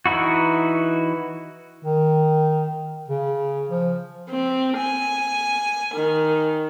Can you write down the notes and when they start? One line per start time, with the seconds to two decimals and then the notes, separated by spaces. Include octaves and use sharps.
0.06 E3 D#4 E4 F#4
1.83 D#3
3.08 C#3
3.69 F3
4.30 C4
4.77 G#5
5.95 D#3